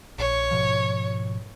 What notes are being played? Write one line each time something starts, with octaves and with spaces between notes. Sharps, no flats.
A#1 C#5
G#2 B2 F3